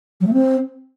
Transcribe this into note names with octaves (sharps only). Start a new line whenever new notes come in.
F#3
A3
C4